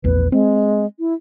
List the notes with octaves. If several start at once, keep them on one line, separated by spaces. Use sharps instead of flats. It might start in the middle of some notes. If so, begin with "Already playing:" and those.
A#1 E2 B4
G#3 C4
E4